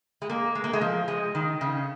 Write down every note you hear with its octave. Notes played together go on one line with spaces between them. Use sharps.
G#3
A#3
G#3
A#3
G#3
F3
G#3
D#3
C#3